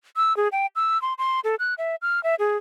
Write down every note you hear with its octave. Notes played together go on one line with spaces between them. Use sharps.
E6
G#4
G5
E6
C6
C6
A4
F#6
E5
F6
E5
G#4